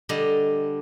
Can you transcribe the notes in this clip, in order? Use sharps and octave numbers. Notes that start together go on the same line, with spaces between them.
D3 G3 D#5